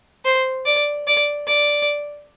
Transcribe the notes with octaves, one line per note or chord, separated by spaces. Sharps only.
C5
D5
D5
D5